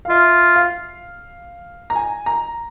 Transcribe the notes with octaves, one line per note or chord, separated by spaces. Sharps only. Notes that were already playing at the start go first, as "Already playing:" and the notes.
F5
F4 E5
F5
A#5
G#5
A#5